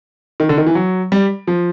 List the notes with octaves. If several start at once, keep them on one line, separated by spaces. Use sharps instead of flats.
D#3
D3
D#3
E3
F#3
G3
F3